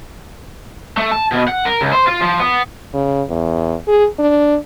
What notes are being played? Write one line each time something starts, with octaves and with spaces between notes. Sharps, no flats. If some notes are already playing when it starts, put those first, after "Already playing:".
A3
A5
B2
F#5
A#4
C#2
C5
F4
F3
B3
C#3
E2
G#4
D4